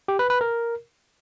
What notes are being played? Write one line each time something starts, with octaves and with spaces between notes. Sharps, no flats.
G4
B4
B4
A#4